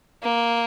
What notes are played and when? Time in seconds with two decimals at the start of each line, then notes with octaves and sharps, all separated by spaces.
0.23 A#3